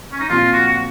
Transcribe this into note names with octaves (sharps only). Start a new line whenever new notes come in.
C#4
D#4
A#2 F3 C4 F4
F#4
F#4